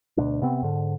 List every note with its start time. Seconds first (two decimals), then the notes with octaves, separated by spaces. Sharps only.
0.17 D2 B2 A3 D4
0.42 C3 B3 C4
0.63 G#2 D3